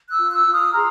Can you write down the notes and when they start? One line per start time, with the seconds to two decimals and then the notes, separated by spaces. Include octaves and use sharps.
0.10 E6 F#6
0.18 F4
0.31 E6 F#6
0.46 F4
0.53 D#6 F6
0.74 G#4 A#5 C6